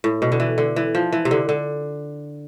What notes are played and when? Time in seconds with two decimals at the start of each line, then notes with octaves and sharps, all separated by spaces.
0.04 A2
0.22 B2
0.32 D3
0.40 E3
0.58 D3
0.76 E3
0.95 F3
1.13 E3
1.25 C3
1.31 D3
1.49 D3